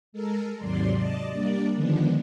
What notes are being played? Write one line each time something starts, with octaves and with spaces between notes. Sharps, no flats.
G#3 A4 A#4
D#2 G#2 C3 F#3 D5 C6
D5 D#5 A5
G3 A#3 D4 D5
D3 D#3 F3 G#3 B3 D4